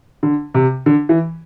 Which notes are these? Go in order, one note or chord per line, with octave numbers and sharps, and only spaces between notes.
D3
C3
D3
E3